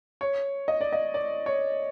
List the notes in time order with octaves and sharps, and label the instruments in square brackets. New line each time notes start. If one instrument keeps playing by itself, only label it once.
[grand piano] C#5
D#5
D5
D#5
D5
C#5